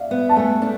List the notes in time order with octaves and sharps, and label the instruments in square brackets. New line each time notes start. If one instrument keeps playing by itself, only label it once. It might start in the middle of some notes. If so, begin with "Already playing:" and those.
Already playing: [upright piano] D5 E5 F5
[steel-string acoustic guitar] B3
[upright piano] A5
[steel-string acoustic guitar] A3 [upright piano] G#5
[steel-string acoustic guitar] D4